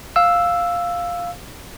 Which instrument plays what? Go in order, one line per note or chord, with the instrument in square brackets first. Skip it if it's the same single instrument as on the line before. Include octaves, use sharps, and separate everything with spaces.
[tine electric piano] F5 E6